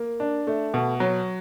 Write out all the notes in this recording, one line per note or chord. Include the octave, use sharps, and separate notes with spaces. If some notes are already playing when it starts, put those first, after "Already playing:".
Already playing: A#3
D4
A3
B2
F#3